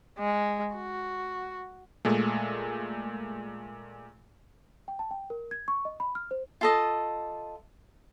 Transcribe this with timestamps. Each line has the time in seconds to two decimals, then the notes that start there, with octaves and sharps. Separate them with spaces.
0.18 G#3
0.75 F#4
2.05 A#2 G#3 A3
4.88 G5
4.99 A5
5.11 G5
5.30 A#4
5.51 G#6
5.68 C#6
5.85 D#5
6.00 B5
6.15 F6
6.31 C5
6.61 F4 A4 D#5